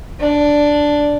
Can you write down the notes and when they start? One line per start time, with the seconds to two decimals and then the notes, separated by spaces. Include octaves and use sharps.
0.20 D4